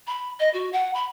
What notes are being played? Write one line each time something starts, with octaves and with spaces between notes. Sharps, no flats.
B5
D#5
F#4
F#5
B5